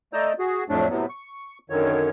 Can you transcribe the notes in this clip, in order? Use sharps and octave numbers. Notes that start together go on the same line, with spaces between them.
A3 D5 D#5 A#5 E6 G6
F#4 G#4
F2 A2 F#3 A3 D4
A2 C3 F#3 B3
C#6
F#2 D3 D#3 C#5